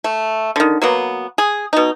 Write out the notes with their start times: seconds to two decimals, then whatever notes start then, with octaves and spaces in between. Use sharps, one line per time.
0.04 A3
0.56 D3 D#3
0.82 F#3 A#3 B3
1.38 G#4
1.73 B2 D#4